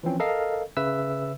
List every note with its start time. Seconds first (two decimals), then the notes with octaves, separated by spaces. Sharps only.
0.03 E3 F3 C4 C#4
0.20 A4 A#4 D#5 F5
0.77 C#3 B4 E5 E6